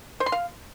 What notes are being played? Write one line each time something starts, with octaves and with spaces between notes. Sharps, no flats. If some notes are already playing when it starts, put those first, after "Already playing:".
C5
C6
F5